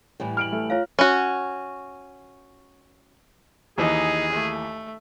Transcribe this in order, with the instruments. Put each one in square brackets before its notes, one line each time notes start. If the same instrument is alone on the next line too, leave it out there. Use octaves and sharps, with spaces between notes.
[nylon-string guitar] A2 E3 G3
[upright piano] F6 D7 F#7
A3
[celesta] F4 C#5 F5
[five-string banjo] C#4 F#4
[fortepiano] D#2 E3 [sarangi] D#4 [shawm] G#4
[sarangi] A3